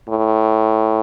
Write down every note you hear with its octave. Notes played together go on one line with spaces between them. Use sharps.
A2